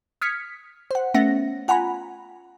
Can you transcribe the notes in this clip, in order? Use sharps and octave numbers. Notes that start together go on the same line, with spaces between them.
D#6 F6 G#6 B6 C#7
C5 F#5
A3 B3 C#4 E5 F#5 A#6
F4 F#5 G#5 A#5 B5